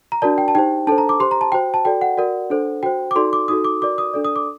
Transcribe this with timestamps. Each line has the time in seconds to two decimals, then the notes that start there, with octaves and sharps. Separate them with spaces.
0.12 A#5
0.22 D4 F#4 A#4 D5 A5
0.38 G5
0.48 A5
0.55 D#4 G4 C5 G5
0.87 D4 A4 C5 A5
0.98 A#5
1.09 D6
1.20 G4 C5 C6
1.31 A#5
1.41 A5
1.52 F#4 C5 G5
1.74 A5
1.85 F#4 A4 D5 G5
2.01 F#5
2.17 F#4 A#4 D5
2.50 D4 A4 C5
2.83 F#4 C5 G5
3.11 D6
3.15 D#4 F#4 A4 D5 C6
3.33 D6
3.48 D#4 F#4 A4 D#6
3.64 D6
3.81 F#4 A#4 D5 D6
3.98 D#6
4.14 D4 A4 D5
4.24 D#6
4.36 D6